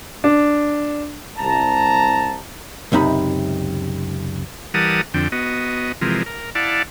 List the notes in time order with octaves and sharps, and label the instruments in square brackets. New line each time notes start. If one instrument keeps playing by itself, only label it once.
[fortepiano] D4
[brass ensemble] C2 A5 A#5
[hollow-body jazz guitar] C#2 F#2 C3 D#4 B5
[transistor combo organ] E3 G3 A#4 F#5 A5 D#6
F2 D3 G5
B3 F#4 D#5
C3 E3 F3 G#3 A#4
A#4
E4 D5 F5 F#5 A5